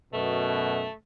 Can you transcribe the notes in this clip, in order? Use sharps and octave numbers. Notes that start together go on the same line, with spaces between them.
F#2 B2 A3